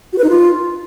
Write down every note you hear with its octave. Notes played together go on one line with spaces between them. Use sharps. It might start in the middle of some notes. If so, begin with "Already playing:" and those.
F#4
B4
D#4
F4